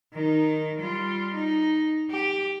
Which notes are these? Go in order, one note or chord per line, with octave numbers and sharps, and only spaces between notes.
D#3 D#4
G3 F4
D#4
G4